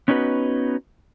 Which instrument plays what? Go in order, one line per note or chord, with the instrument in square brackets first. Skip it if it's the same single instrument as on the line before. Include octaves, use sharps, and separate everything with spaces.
[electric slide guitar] B3 C#4 D#4 F#4 B4